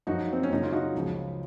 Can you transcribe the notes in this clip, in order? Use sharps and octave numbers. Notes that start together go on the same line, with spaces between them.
F#2 F3 D#4 F#4
C4
C#4
F#2 C#3 F#3 D#4
F4
D#4 F#4
C#2 C#3 F3